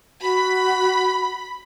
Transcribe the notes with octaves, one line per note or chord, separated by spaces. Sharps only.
F#4 B5